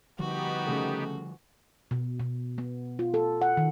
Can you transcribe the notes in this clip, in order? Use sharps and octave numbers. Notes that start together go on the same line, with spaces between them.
D3 F3 G3 B3 D#4 F#4 G4
C#3 A3
B2
B2
B3
F4
A4
F#5
D#3